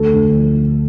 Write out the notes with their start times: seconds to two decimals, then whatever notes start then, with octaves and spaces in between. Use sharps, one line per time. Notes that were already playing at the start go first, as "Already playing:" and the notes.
Already playing: D2 A4
0.13 D2
0.35 F3